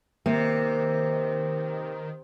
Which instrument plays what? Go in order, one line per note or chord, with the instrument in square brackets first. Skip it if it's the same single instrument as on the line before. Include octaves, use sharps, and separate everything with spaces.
[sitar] C3 [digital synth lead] D#3 [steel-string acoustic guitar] A#3